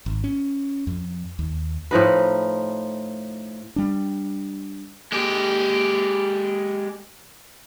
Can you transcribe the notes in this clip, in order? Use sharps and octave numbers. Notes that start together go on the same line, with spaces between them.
G#1
C#4
F2
D#2
A2 F3 D#4 B4
G3 D4
G#3 G4